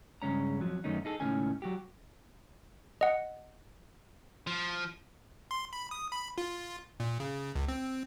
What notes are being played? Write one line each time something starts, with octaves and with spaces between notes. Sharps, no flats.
G2 C#3 G#3 C#4 A#5
F2 F3 F#3
F#2 D#3 A3 C#4 D#4
D#4 G#4 A4
C#2 A2 D3 D#3 C#4 G#5
F#3 F#4 G4
D#5 F#5
F3
C6
B5
D#6
B5
F4
A#2
C#3
C#2
C4